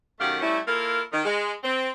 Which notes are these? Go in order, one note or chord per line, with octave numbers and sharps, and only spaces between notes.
F#2 D#3 A3 G4 F5 F#5
G3 A3 C#4 E4
A#3 E4 F4 A4 A#4
D#3
G#3
C4